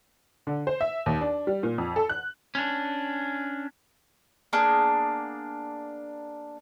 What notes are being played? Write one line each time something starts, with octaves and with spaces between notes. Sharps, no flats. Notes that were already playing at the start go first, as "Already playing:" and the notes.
D3
C5
E5
D#2
D4
G3
A#2
F2
A4
F#6
C#4 D4
A#3 B3 D4 G#4